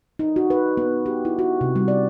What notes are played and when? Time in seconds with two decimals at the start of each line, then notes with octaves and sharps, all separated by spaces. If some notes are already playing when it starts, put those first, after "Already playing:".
0.19 D#4
0.36 F#4
0.50 B4
0.77 B3
1.06 G4
1.25 E4
1.39 F#4
1.61 C3
1.76 G3
1.88 D5